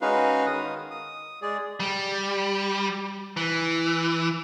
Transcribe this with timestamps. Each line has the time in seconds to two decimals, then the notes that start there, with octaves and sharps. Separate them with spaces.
0.01 G#3 C#4 D#4 F#4 B4 F5
0.46 D#3 D#6
0.91 D#6
1.42 G#3 G#4 D5
1.80 G3
3.37 E3